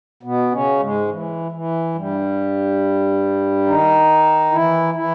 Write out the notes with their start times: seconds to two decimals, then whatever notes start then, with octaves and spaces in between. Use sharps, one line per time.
0.23 B2 B3
0.51 C#3 C#4
0.80 G#2 G#3
1.08 E3
1.52 E3
1.94 G2 G3
3.66 D#3 D#4
4.52 E3 E4
4.94 E3 E4